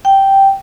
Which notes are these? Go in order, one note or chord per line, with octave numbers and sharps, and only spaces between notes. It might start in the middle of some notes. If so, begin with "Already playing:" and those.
G5